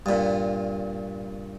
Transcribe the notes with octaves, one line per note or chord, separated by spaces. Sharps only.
G2 A#2